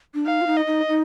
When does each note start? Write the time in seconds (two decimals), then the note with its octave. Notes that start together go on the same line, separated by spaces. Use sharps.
0.14 D4
0.26 D#4 F5
0.41 F4
0.47 D#4
0.57 D#5
0.67 D#4
0.88 D#4